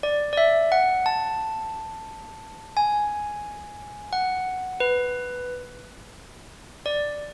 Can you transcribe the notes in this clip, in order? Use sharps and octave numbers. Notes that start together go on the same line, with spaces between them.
D5
D5
E5
F#5
A5
G#5
F#5
B4
D5